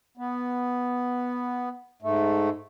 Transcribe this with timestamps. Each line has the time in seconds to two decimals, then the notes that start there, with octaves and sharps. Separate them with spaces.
0.17 B3
2.02 G#2 A3